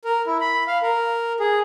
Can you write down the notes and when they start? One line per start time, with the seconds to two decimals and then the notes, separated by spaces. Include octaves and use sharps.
0.05 A#4
0.27 E4
0.41 B5
0.67 F5
0.82 A#4
1.40 G#4